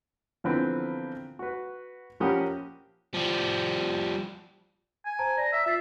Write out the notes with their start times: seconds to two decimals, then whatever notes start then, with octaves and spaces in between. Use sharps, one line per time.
0.44 A#1 D3 E3 B3 C4 B4
1.39 F#4 B4
2.20 A#1 C#4 G4 A#4 F#5 D#6
3.14 F3 G3
5.05 G#5
5.19 C5 A5 A#5
5.38 D5 A#5
5.53 E5
5.66 F4 E5 A6 C7